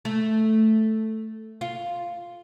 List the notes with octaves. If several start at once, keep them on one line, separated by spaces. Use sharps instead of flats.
A3
F4